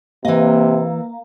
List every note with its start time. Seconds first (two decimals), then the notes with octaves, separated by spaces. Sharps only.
0.25 C3 E3 A#3 D#5